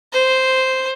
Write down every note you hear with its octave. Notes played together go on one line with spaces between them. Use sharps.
C5